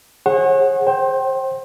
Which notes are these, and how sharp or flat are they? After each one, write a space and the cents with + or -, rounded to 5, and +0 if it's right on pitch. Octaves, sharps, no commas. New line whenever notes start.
G#4 +0 C#5 -40 F#5 +0
C5 +25 G5 -20